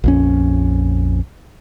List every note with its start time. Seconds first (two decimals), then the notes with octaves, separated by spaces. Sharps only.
0.04 A#1 F2 C#4